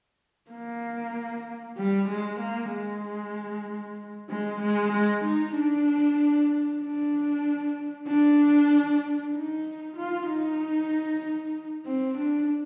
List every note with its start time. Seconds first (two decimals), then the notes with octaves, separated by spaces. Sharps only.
0.51 A#3
1.77 G3
2.08 G#3
2.40 A#3
2.72 G#3
4.29 G#3
4.61 G#3
4.92 G#3
5.24 D#4
5.55 D4
6.81 D4
8.07 D4
9.33 D#4
9.96 F4
10.28 D#4
11.86 C4
12.17 D4